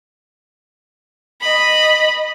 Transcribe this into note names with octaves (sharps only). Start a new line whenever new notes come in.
D#5 B5